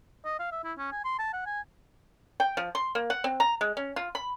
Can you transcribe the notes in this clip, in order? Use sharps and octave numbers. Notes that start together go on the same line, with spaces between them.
D#5
F5
E5
E4
C#4
G#5
C6
A5
F#5
G#5
G5
F3
C6
A#3
F#5
C4
A#5
G#3
C#4
F4
B5